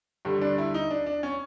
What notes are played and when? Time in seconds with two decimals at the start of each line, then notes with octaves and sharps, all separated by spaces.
0.25 G2 D3 G3
0.42 D4
0.58 E4
0.74 D#4
0.91 D4
1.06 D4
1.23 C#4